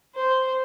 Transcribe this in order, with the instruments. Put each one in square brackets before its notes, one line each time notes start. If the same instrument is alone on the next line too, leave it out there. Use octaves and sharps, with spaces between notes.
[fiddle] C5